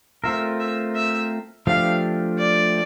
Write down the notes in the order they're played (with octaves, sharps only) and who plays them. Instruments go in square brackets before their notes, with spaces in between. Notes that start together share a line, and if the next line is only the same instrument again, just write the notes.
[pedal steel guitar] A3 C4 F4 A#4 [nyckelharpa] E5
[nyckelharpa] E5
E5
[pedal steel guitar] F3 A3 D4 G4 [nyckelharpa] F5
[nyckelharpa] D5